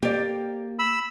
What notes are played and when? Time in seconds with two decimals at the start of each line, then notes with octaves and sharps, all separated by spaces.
0.03 A#3 G4 D5
0.79 B5 E6